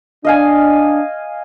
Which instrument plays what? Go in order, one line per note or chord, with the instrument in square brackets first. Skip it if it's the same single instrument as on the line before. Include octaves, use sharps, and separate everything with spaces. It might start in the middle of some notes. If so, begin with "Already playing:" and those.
[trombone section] D4 [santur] D#5 F5 G#5